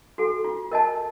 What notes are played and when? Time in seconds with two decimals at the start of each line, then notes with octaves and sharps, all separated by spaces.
0.18 F#4 A4
0.44 F4
0.72 A#4 D#5 A5